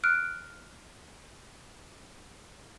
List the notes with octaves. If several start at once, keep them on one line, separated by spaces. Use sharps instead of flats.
F6 F#6 D7